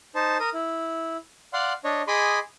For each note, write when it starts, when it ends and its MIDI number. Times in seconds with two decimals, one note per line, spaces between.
0.15 0.37 63
0.15 0.37 72
0.15 0.37 81
0.40 0.50 70
0.40 0.50 87
0.54 1.17 64
1.53 1.73 74
1.53 1.73 77
1.53 1.73 78
1.53 1.73 84
1.84 2.02 62
1.84 2.02 73
1.84 2.02 75
2.08 2.39 68
2.08 2.39 75
2.08 2.39 80
2.08 2.39 83
2.08 2.39 84
2.08 2.39 86